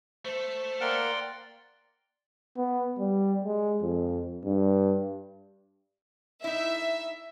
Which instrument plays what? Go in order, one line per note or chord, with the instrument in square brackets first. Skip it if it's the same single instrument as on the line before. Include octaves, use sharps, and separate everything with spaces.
[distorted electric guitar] A3 A4 [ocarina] C5
[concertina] A#3 F#5 F6 [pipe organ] D5 G5 C6
[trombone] B3
G3
G#3
F2
G2
[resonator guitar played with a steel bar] D#4 E4 [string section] E5